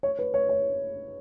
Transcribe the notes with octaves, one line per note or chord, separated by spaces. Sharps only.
C#5
B4
C#5
C#5